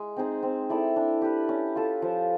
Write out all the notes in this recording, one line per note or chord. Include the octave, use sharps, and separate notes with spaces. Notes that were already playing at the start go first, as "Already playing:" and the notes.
Already playing: G#3
C4 D#4 G#4
C4
E4 A4 D5
D4
G4 B4
C#4
F4 A4
F3